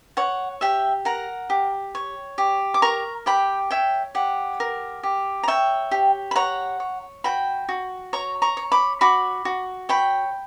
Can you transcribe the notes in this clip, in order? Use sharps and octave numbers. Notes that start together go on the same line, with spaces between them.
C#5 F#5
G4 E5 G5
A#4 F#5 A#5
G4
C#5
G4
D6
A#4 A#5 C#6
G4 G5 B5
C#5 E5 G5
G4 F#5
A#4
G4
A#5
C#5 E5 G5
G4
B5
C#5 F#5 A#5
C#5
F#4 G5 B5
F#4
C#5 A#5 C#6
A#5 C#6
C#5
B5 D6
F#4 B5 D6
F#4
C#5 G5 B5